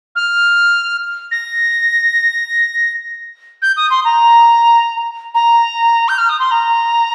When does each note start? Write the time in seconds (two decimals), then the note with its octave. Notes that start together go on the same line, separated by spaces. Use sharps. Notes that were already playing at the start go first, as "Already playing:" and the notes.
0.16 F6
1.31 A#6
3.62 G6
3.77 D#6
3.90 C6
4.05 A#5
5.35 A#5
6.09 G6
6.18 F6
6.29 D#6
6.39 C6
6.51 A#5